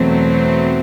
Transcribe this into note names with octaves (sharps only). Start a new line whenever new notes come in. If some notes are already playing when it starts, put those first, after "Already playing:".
Already playing: E2 B2 F#3 A3 C4